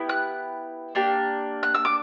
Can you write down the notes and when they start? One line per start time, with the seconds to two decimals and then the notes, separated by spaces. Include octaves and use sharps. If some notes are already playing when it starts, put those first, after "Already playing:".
Already playing: B3 E4 G4
0.09 F#6
0.95 A#3 D4 G4
1.63 F#6
1.75 E6
1.85 D6